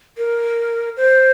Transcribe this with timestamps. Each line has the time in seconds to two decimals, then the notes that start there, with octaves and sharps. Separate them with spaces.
0.17 A#4
0.97 C5